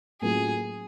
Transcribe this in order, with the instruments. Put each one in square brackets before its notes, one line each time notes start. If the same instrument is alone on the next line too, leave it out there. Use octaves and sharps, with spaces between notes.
[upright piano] A2 F#3 A#3 C#4 F4 [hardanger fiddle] G#4